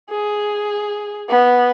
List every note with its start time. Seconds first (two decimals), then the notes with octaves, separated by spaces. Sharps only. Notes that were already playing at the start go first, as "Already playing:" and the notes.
0.10 G#4
1.29 B3